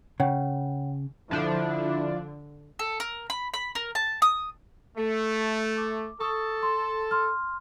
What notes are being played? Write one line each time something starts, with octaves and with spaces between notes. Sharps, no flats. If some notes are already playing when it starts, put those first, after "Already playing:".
C#3 C#5 F#5 G5
D3 F3 D4 E4
A4
A#4
B5
B5
A#4
A5
D#6
A3
D6
A4 C#6 D#6
C6
C6 F6